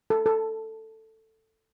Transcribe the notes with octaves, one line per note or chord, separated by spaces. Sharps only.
A4
A4